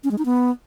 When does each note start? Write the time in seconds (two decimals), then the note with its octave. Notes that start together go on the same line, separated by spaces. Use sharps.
0.04 C#4
0.11 G#3
0.18 D#4
0.25 B3